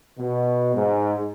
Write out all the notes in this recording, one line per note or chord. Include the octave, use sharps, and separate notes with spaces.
B2
G#2